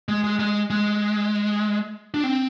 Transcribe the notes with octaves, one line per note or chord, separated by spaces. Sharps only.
G#3
G#3
G#3
G#3
D4
C4